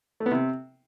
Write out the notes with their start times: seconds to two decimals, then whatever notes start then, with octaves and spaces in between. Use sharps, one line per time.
0.20 A3
0.26 B3
0.32 C3